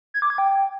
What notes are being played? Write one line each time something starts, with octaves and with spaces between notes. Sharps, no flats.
G#6
D6
G#6
G5